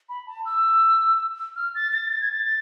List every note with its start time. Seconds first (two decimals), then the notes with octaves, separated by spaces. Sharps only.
0.09 B5
0.27 A5
0.45 E6
1.56 F6
1.75 A6
1.93 A6
2.12 A6
2.21 G#6
2.32 A6